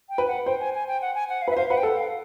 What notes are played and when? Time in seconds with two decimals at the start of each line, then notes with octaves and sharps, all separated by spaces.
0.09 G5
0.18 B4
0.28 F#5
0.46 C5 G5
0.60 G#5
0.74 G#5
0.88 G5
1.02 F#5
1.15 G#5
1.29 F#5
1.42 F5
1.48 B4 E5
1.56 C5 F5
1.70 B4 F#5
1.78 G5
1.83 A4 F#5
1.97 F5